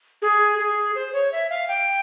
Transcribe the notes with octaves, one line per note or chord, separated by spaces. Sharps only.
G#4
G#4
C5
C#5
E5
F5
G5